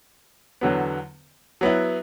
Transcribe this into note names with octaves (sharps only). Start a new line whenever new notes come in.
E2 D3 F#3 B3
F#3 B3 E4